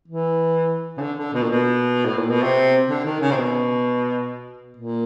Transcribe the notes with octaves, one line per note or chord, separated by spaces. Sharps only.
E3
C#3
D3
D3
B2
A#2
B2
A2
A#2
B2
C3
D3
D#3
C#3
C3
B2
A#2